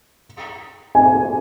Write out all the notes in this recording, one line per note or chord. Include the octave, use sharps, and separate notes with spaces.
G#5